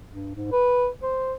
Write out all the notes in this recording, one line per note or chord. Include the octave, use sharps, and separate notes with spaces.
G2
G#2
B4
C5